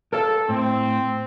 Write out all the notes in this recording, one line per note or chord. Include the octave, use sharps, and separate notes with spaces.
A4 A#4 C#5 F5
A2 C4